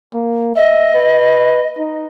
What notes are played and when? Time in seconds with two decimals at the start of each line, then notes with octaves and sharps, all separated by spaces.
0.14 A#3
0.56 D#5 E5
0.95 B4
1.78 D#4